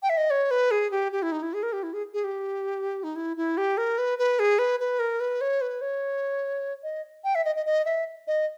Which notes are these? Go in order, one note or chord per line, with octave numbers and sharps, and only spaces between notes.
G5
E5
D#5
C#5
B4
G#4
G4
G4
E4
D#4
E4
G#4
A#4
G4
E4
G#4
G#4
G4
D#4
E4
E4
G4
A#4
B4
B4
G#4
B4
B4
A#4
B4
C#5
B4
C#5
D#5
G5
E5
D#5
D#5
D#5
E5
D#5